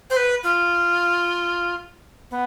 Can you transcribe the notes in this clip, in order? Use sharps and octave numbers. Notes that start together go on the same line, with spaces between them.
C5
B4
F4
B3